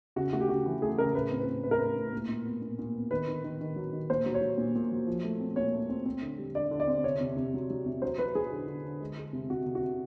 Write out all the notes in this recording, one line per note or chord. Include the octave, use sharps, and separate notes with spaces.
C#3 F#4
A3 F#4
G4
C#3 F#4
E3
A3 G#4
C#3 A#4
A2 B4
C4
B4
C4
A2 B4
A#4
A2 B4
A2
A#2
A#2
B3
A#2
A#2
B3
D#3 B4
D#3
D#3
D#3
F#3
D#3
A#2 C5
F#3
C#5
F#3
A#2
A#2
F#3
F3
A3
C4
A#2 C#5
A3
C4
C4
D3
G3
D3 D5
D3
D5
C4
C3 C#5
C3
C3
F#3
F#3
C3
F#3 C5
F#3 B4
F#3 G#4
D3
D3
D3
G#3
G#3
C3
C3 F#4
C3
F#4
C3